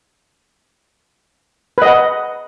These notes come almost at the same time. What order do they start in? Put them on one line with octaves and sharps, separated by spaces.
B4 D#5 F#5